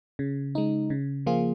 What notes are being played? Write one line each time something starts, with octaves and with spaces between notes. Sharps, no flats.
C#3
G#3 D#4
C#3
F3 A#3 F4 G#4